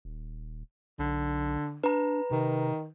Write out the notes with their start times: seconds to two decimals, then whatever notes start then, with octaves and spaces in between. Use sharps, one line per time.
0.05 D#1
0.99 B1 D3
1.84 D4 B4 A#5
2.31 C3 D#3